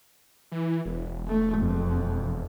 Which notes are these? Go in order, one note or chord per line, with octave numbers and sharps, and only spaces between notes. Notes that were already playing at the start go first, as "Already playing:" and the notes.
E3
E1
A3
F2